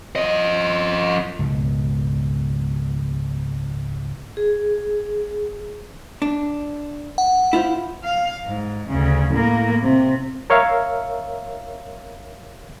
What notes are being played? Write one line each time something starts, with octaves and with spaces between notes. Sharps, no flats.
F3 D#5
C#2 G#2 B2
G#4
D4
F#5
E4 F4 C5
F5
G#2
D2 C#3
A2 A#3
C3
A#4 C#5 E5 F5